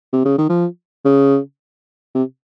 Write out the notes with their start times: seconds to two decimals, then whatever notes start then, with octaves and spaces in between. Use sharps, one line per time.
0.13 C3
0.25 C#3
0.38 D#3
0.49 F3
1.05 C#3
2.15 C3